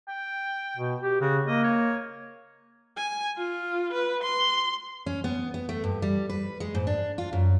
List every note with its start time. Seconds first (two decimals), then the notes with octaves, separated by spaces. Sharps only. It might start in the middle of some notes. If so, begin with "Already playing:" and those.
0.08 G5
0.77 B2
1.03 G4
1.21 C#3 F#4
1.47 A#3 D#5
1.63 C#5
2.97 G#5
3.37 F4
3.93 B4
4.23 C6
5.06 C#4
5.24 B3
5.54 B3
5.69 A3
5.84 G2
6.02 G3
6.29 B4
6.60 G#3
6.75 G#2
6.87 D4
7.18 F4
7.33 F#2